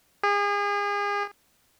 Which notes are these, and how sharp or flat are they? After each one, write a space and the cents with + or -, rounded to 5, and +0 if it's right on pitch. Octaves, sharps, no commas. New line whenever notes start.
G#4 -35